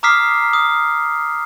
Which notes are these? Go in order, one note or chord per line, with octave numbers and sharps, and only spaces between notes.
A#5 D6 D#6 F6 B6 C7
D#6